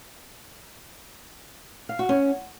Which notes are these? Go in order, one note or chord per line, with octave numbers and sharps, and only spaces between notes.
F5
F#4
C#4